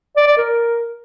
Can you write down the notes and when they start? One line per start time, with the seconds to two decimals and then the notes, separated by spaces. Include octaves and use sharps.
0.17 D5
0.27 D5
0.38 A#4